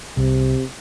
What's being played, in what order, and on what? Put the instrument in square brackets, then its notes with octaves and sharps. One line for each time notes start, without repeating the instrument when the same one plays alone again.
[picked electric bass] C2 [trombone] C3